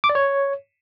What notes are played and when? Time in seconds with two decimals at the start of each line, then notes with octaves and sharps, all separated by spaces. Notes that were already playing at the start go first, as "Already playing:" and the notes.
0.04 D6
0.09 D5
0.15 C#5